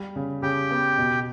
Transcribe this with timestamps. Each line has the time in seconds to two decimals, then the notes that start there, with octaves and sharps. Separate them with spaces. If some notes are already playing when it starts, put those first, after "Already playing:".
Already playing: G3
0.16 C#3
0.42 C#3 G4 G5
0.71 B3
0.98 B2